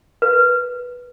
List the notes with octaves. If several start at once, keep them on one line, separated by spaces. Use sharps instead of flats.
B4